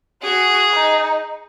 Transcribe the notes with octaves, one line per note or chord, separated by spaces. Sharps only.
F#4 G#4
D#4